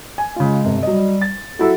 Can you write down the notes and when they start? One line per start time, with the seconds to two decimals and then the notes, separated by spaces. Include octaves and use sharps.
0.18 G#5
0.36 C#3 G#3 F4
0.65 G1 C3
0.83 F#3 G3 D#5
1.21 A6
1.59 F#3 E4 F#4 A4